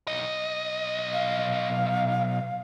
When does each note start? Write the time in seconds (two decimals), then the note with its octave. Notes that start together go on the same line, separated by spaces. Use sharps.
0.08 B1 D#5
1.13 F5